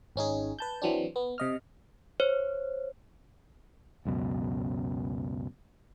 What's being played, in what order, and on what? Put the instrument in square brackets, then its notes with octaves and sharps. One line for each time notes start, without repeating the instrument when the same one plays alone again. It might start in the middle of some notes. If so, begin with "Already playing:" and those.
[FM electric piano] G#1 C#4 D#4 G#4
B4 A5 G6
E3 F#3 C4 D4
B3
C3 D#5 F6
[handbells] C5 C#5
[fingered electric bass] C#2 F#2 B2